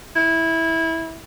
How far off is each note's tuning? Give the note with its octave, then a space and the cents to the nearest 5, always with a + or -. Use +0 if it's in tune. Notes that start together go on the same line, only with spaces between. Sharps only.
E4 -15